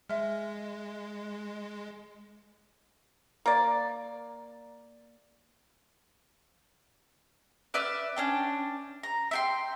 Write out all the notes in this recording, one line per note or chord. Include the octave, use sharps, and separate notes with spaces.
G#3 E5 F6
A#3 D5
B4 D5 E5 F6
C#4 D4 G5
A#5
E5 G5 C6